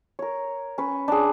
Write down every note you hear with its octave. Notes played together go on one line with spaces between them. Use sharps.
A#4 C#5
C#4 B4 C#5
D4 G#4